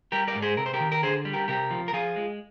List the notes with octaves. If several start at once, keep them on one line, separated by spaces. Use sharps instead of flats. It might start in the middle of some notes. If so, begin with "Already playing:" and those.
G3 G4 A#4
A#4 D5
G#2
G#4 C5
C3 A#4
C5
G4 A#4
D#3
A#4
D3 G#4 C5
G3
G4 A#4
C3 G4 A#4
F3
A#4
F3 F4 G#4
G#3